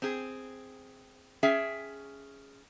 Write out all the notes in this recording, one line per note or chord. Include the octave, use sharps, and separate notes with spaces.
C4 G#4
C#4 G#4 E5 G5